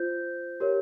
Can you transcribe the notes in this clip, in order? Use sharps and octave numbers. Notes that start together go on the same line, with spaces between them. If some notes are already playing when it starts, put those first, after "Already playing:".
Already playing: F4 C5 G6
G4 A#4 C#5